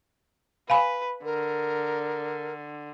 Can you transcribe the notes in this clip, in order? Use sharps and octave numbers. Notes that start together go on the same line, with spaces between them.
B4 F5 G#5 B5
D3 A#4